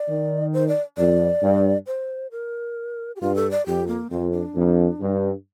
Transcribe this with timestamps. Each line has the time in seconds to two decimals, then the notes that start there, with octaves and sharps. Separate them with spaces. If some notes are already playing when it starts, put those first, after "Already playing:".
Already playing: D5
0.08 D#3
0.53 C5
0.68 D5
0.97 F2 D5
1.42 G2
1.87 C5
2.31 A#4
3.16 G4
3.21 G2 F4
3.36 A4
3.51 D5
3.66 F2 G4
3.88 A#3
4.10 F2 C4
4.32 D4
4.56 F2
5.00 G2